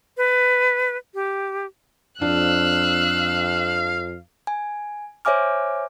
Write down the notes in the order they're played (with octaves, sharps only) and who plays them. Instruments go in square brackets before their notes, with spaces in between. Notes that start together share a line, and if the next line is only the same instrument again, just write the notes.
[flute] B4
G4
[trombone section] F2 [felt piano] D4 [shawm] F5 [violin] E6 F#6
[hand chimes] G#5
C5 C#5 E5 G#5 D6 F6